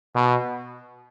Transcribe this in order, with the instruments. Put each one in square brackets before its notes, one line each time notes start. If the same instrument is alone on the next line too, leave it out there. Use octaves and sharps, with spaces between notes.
[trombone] B2